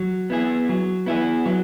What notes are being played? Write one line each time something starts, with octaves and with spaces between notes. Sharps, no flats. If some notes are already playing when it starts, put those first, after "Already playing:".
Already playing: F#3
B3 E4 G#4
F#3
B3 E4 G#4
F#3